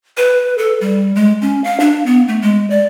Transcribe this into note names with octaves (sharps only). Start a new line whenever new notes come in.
B4
A4
G3
G#3
C#4
F5
D4
B3
A3
G#3
D5